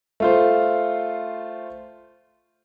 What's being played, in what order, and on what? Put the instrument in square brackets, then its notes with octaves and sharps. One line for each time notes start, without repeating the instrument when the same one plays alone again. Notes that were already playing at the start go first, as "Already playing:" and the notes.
[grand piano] A3 F4 C5